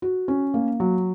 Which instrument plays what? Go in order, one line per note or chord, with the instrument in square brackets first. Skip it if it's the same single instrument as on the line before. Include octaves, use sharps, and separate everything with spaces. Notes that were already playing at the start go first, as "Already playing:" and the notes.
[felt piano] F#4
C#4
A#3
F#3